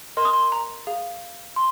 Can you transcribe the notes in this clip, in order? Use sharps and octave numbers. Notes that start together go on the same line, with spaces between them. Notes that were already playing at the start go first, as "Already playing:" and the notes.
A#4 D#5 C6
D#6
C6
A#5
G#4 F5
C6